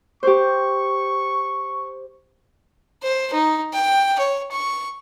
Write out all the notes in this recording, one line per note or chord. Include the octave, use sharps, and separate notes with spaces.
G4 C5 C#6
C5
D#4
G5
C#5
C#6